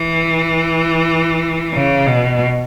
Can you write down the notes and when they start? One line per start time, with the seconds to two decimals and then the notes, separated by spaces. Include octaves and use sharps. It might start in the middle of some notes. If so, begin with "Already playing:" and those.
Already playing: E3
1.73 C#3
2.07 B2